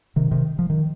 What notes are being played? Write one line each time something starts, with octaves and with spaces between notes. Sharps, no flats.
C3 D#3
C3 D#3
F3
D#3